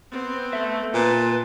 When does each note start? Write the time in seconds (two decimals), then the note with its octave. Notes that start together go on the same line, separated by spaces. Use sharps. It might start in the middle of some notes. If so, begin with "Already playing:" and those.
0.11 B3 C4
0.53 A4 E5
0.94 A#2 B4 A5 C6